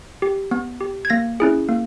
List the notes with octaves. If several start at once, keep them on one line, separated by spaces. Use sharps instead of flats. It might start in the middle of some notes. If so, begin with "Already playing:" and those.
G4
B3
G4
G#6
A#3 A#6
C#4 E4 G#4
A#3